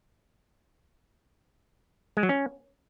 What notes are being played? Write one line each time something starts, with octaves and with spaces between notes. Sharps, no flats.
G#3
F#3
C#4